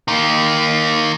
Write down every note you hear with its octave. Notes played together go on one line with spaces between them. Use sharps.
D#3 A#3